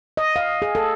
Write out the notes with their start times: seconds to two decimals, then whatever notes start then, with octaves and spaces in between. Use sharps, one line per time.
0.17 D#5
0.36 F5
0.62 G#4
0.75 A4